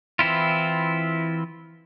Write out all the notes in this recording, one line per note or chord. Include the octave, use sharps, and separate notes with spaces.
E3 C4 E4 F4